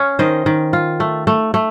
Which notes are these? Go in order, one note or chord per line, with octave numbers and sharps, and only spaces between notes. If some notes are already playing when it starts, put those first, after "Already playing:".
Already playing: C#4 F5
D#3 C5 D#5
D#3
F4
A3
A3
A3